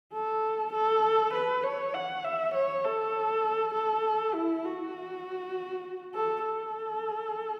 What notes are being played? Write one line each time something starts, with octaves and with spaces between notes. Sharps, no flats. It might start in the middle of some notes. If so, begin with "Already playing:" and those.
A4
A4
B4
C#5
F#5
E5
C#5
A4
A4
E4
F#4
A4
A4